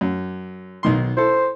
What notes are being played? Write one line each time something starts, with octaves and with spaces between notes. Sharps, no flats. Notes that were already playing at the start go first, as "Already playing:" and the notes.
F#2
B1 D#3 C6
E4 A4 C5